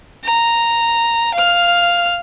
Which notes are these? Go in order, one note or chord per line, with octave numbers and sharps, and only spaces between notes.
A#5
F5 F6